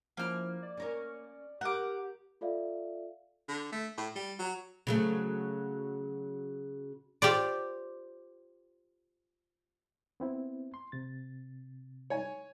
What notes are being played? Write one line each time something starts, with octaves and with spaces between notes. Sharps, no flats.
F3 A#3 C#4 E4 F6
D5
C#4 A#4 C#5
G4 A#4 F#5 D6
F4 A4 D5 E5 F5
D3
A3
A2
G3
F#3
C#3 F#3 A3
F4 G4 C5 D5
B3 C4 E4
C6
C3 A6
C#5 G#5